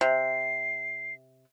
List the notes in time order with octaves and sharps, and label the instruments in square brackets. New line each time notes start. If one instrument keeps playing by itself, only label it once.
[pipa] C3 [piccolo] C7